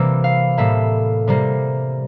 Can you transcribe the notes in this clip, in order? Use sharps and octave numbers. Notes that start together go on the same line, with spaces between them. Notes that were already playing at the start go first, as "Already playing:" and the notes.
Already playing: C3 E3 G3 A#3 D6 E6
F5
A2 G3 A#3 E5
C3 G3 A#3